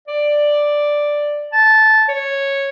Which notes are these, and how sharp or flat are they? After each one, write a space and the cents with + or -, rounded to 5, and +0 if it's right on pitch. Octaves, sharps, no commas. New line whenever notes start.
D5 +5
A5 -10
C#5 -5